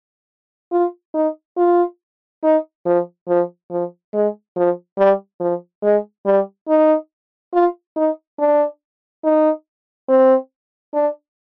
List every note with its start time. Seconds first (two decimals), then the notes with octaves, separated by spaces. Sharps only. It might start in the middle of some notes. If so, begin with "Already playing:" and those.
0.72 F4
1.14 D#4
1.57 F4
2.43 D#4
2.85 F3
3.28 F3
3.70 F3
4.14 G#3
4.56 F3
4.98 G3
5.40 F3
5.83 G#3
6.26 G3
6.68 D#4
7.53 F4
7.96 D#4
8.39 D4
9.24 D#4
10.08 C4
10.94 D4